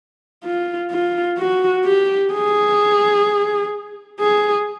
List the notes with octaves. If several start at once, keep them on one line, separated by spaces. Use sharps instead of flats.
F4
F4
F#4
G4
G#4
G#4